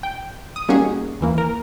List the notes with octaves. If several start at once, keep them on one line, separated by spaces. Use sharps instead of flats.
G5
D#6
G3 A#3 C#4 D#4 F#4 G#4
D#2 E3 A#3
A#4